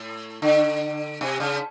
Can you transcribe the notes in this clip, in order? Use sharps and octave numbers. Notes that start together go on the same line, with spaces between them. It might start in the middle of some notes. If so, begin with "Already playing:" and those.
Already playing: A2
D3
C3
C#3